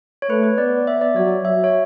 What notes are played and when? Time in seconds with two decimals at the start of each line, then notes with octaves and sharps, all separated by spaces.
0.22 C#5
0.29 A3 B4
0.43 B4
0.58 B3 D5
0.87 E5
1.01 D5
1.16 F#3 C#5
1.45 F#3 E5
1.64 C#5